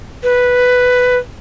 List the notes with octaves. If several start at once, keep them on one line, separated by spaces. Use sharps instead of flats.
B4